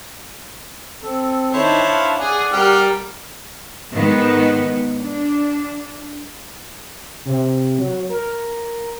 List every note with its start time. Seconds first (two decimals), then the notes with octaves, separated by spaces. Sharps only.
1.03 C4 A4
1.54 D#3 D4 E4 C5 C#5
1.86 F5
2.18 G#4 D5 F#5
2.52 G3 A#4 G5 F6
3.92 G#2 D#3 G#3 B3
4.99 D4
7.25 C3
7.78 F#3
8.10 A#4